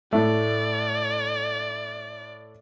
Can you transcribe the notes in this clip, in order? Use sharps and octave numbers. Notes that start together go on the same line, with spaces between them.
A2 A3 D5